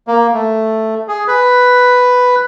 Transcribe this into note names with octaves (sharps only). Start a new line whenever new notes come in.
A#3
A3
G#4
B4